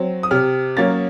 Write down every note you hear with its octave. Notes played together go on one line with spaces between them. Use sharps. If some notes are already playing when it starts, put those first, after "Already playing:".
Already playing: F#3 C4
D#6
C3 F6
F#3 A#3 C#4 A6